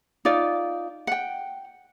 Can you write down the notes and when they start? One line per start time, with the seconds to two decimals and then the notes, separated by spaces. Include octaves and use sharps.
0.25 D#4 F4 D5
1.07 F#5 G5